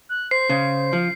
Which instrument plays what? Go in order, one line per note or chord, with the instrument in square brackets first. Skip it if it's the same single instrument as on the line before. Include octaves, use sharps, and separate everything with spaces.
[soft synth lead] F#6
[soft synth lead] C5 [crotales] C7
[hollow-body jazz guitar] C#3 [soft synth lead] C5
[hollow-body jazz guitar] F3